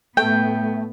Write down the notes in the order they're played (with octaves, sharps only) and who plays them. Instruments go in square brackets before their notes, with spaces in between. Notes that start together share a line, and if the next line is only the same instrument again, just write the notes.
[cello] A2 B3 [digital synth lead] A3 [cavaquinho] G5